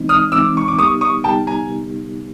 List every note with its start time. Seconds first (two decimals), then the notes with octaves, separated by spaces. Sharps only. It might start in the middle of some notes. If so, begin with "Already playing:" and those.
Already playing: E3 G#3 C4 D#4
0.09 D#6 F6
0.32 E3 G#3 C4 D#4 D6 E6
0.57 C#6
0.68 D6
0.78 G3 B3 D#4 G4 A#4 C#6 D#6
1.01 C#6 D#6
1.24 G3 B3 D#4 G4 A#4 G5 A5
1.47 G#5 A#5